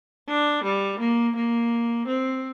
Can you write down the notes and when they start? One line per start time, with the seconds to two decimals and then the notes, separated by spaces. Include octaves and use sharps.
0.28 D4
0.64 G3
1.00 A#3
1.36 A#3
2.07 C4